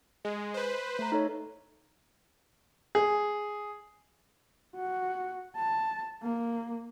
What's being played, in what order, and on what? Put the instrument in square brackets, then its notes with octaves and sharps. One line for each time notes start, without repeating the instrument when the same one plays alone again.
[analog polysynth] G#3
B4 C5
[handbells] A3 A#5
D#4 A4 C#5
[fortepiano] G#4
[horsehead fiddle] F#4
A5
A#3